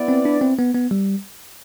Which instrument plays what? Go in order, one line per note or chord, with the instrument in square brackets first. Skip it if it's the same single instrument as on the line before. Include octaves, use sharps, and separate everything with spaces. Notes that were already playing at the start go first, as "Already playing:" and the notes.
Already playing: [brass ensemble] B3 E4 B4 D5
[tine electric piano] C4
D4
C4
B3
B3
G3